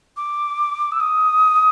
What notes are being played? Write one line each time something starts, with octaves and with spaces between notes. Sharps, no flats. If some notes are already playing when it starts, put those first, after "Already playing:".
D6
E6
D#6